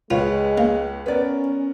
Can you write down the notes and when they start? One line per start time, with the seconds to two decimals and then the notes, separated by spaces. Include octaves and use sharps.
0.11 C#2 G#3 F4 B4 C#5
0.58 A#3
1.06 B3 C#4 A#4 B4 D5